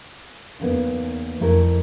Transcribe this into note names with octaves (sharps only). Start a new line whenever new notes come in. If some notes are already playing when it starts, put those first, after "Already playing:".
E2 C#3 A#3 B3 D#4
F2 A3 E4 A#4